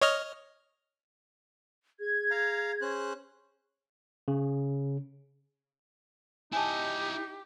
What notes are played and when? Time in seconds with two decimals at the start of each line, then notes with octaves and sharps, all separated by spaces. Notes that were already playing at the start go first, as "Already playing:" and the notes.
0.01 C#5 D#5 F6
2.00 G#4 G#6
2.31 F5 A#5
2.82 C#4 C5 F#6
4.28 C#3
6.53 D#4 E4 G4 D#5 G#5 A5